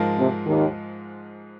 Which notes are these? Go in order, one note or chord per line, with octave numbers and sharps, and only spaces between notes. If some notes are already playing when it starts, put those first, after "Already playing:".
Already playing: G#2 F3 G#3 F4 A#4
C3
D#2 D#3